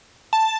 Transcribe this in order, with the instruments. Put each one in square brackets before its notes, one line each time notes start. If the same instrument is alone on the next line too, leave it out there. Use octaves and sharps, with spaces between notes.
[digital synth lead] A5